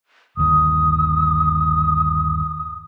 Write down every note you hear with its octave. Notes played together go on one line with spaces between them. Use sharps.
G1 D#2 D#6